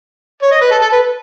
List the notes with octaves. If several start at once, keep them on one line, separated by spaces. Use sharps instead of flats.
C#5
D#5
B4
A4
A4
B4